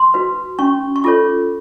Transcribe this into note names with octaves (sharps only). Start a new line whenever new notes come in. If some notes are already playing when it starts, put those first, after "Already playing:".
Already playing: C6
F#4 B4
C#4 C#6
C#6
F4 A4 C#5 D6